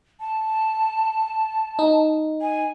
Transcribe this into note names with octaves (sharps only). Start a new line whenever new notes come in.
A5
D#4
G#5